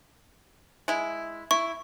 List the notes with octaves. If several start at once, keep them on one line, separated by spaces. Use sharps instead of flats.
G#3 E4
E4 C#6